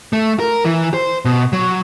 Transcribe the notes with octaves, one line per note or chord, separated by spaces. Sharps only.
A3
A#4
E3
C5
B2
F#3